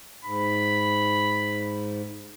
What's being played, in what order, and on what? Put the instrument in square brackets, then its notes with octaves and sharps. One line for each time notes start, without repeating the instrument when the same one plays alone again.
[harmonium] G#2 [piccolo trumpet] B5